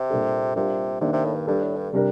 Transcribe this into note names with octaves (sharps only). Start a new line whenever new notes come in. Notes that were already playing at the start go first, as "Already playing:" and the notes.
Already playing: C3
A#2 G3 A#3 D4 A4
C3 G3 D4 F4 A#4
C3 D#3 A#3 D4
C3
A2
G2
G2 G3 D4 A4
A2
G2
C3 G3 D4 G4 A#4